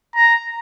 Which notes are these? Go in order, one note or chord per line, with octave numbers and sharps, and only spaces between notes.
A#5